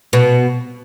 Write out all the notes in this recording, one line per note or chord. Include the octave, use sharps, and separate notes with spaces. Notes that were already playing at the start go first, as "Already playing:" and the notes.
B2